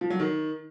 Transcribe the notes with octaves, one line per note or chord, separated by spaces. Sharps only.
F3
F#3
D#3